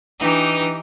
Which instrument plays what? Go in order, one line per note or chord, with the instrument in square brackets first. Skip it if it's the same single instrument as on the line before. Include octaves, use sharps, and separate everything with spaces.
[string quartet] E3 D#4 G4 [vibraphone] D4 B4 A#5